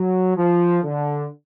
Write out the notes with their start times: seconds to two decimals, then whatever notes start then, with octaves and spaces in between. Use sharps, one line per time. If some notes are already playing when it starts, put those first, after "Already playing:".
Already playing: F#3
0.36 F3
0.84 D3